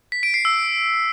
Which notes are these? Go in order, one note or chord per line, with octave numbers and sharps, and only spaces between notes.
B6
D7
C7
E6